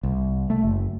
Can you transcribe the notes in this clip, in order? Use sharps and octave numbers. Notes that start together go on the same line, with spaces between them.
C2
A3
F#1